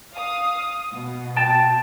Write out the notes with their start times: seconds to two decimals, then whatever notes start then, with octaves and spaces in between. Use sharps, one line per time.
0.14 F5 D#6
0.94 B2
1.36 G5 A5